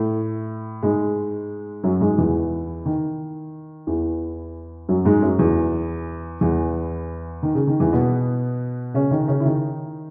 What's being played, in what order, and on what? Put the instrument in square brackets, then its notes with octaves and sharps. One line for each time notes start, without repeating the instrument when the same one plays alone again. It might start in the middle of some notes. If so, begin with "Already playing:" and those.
Already playing: [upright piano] A2 A3
G#2 G#3
F#2 F#3
G#2 G#3
E2 E3
D#3
E2 E3
F#2 F#3
G#2 G#3
F#2 F#3
E2 E3
E2 E3
D#3
C#3
D#3
E2 E3
B2 B3
C#3 C#4
D#3 D#4
C#3 C#4
E4
D#3 D#4